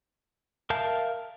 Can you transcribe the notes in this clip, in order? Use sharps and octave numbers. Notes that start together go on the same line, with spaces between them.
A#4 E5 F5 A5 G6